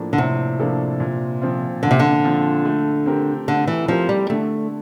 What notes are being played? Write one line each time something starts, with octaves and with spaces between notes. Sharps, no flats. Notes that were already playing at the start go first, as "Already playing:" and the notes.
Already playing: A2 F3 A#3 D4 A4
D3
A2 C3
F3 A#3 D4 A4
A#2
F3 C4 F4
A#2 D3
C3
D3
F3 C4 F4
A3
C4 G4 A#4
D3 A3
E3
F3 C4 G4 A#4
G3
D3 A3